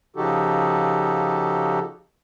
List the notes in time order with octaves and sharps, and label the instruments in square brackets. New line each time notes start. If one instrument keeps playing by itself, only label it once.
[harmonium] C#3 F3 D#4 F#4 G4 A4